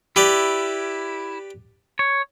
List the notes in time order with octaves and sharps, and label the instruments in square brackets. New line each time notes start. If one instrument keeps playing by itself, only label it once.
[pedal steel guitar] E4 [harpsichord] G4 B4 D5
[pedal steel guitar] C#5